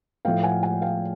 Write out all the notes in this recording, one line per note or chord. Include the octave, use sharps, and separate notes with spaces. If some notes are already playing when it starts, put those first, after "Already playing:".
A2 F3 A3 F5 G5
F#5 G#5
F#5 G#5
F5 G5